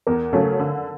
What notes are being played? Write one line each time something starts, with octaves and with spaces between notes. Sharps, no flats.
E2 A#4
C#3 F#3 A3 C#4 A4
D3